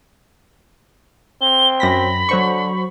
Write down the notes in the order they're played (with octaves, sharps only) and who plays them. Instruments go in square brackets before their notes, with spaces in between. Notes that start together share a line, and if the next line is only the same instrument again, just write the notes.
[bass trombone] C4 [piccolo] G7
[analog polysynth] F#2 A#6 B6 [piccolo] B5
[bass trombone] D3 [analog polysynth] F#3 C5 C#6